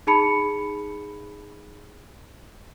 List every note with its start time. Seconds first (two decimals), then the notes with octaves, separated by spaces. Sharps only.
0.07 D#4 G#4 A5 B5 C#7